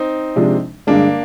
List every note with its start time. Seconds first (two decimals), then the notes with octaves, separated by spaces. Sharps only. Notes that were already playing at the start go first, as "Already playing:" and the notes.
Already playing: C4 D#4
0.36 C3 F3 G#3 D4
0.87 G2 D3 G#3 A#3 D4